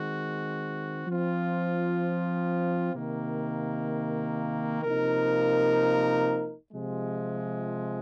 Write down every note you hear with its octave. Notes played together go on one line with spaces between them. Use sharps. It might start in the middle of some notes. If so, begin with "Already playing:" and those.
Already playing: D#3 G#3 C4 F#4
F3 C4 F4
C3 D#3 A#3
C3 F3 A#3 D#4 A#4
C3 F3 G#3